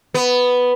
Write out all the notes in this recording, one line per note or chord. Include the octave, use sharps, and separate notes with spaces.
B3